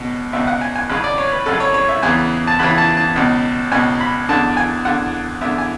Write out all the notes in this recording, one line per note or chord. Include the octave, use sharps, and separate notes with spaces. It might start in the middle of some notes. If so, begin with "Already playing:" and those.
Already playing: C#2 B2
C#2 B2 E5
F#5
G#5
G#5
G#1 F#2 C#3 B5
D5
C#5
B4
G#1 F#2 C#3 A4
C#5
C#5
E5
E2 C#3 E3 G#5
A5
E2 C#3 E3 B5
A5
A5
C#2 B2
C#2 B2 G#5
B5
E2 D3 A5
G#5
E2 D3 F#5
E2 D3 E5
G#5